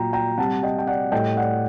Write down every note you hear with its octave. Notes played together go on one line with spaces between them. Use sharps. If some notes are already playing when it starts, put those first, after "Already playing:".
Already playing: A#2 F#3 G5 A#5
G5 A#5
C3 G3 F#5 A5
D#5 G5
G5
D5 F#5
A2 G3 D#5 G5
D5 F#5